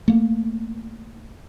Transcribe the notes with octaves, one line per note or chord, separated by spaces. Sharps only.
A3 A#3